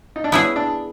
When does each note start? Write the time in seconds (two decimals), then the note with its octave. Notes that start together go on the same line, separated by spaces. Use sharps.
0.16 D#4
0.24 D4
0.32 B3 C#4 E4 G#4
0.56 D4